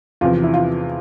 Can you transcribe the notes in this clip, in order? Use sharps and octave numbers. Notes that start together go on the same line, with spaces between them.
E2 C3 F3 F4
E4
F4